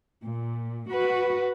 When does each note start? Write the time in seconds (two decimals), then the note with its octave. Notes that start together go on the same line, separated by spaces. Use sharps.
0.24 A#2
0.91 F#4 B4